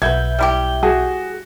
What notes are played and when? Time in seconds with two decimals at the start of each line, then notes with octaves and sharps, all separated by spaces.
0.02 B1 F#4 B4 E5 G6 G#6
0.39 G3 E4 G4
0.83 F#4 G#4